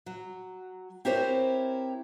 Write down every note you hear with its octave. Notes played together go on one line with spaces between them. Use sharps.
F#3
C4 E4 G4 A#4 C5 C#5